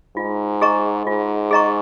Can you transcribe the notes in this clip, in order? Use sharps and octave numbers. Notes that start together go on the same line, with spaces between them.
G#2 F4
G#4 D#5 A#5 C#6
G#2 F4
G#4 D#5 A#5 C#6